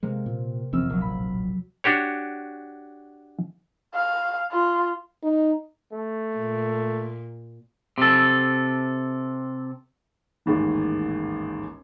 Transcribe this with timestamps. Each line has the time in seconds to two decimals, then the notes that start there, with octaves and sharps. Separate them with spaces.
0.03 C3 G#3 A#3
0.26 A#2
0.73 F1 A#1 E2 C4 E6 F6
0.90 D1 A#1 F#3 A#3
1.01 B5
1.84 D4 F#4 G4 C#5
3.94 F5
4.51 F4
5.23 D#4
5.93 A3
6.36 A#2
7.98 C3 A4
10.46 A1 D#2 G#2 E3